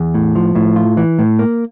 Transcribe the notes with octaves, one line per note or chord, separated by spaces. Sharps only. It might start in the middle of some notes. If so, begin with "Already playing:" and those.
Already playing: E2
A2
F3
A2
F4
E3
A2
A#3